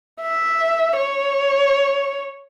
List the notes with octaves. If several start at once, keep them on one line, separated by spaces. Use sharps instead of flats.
E5
C#5